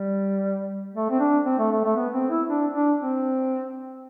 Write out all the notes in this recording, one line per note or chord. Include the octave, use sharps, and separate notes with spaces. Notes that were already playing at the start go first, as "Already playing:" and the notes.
Already playing: G3
A3
C4
D4
C4
A3
A3
A3
B3
C4
E4
D4
D4
C4